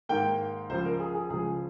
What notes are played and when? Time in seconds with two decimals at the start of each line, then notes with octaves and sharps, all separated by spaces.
0.09 G#2 D#3 A#3 G5
0.69 C#2 C#3 F3 C5
0.85 A#4
1.00 G#4
1.15 G#4
1.30 C#2 C#3 F3 G#4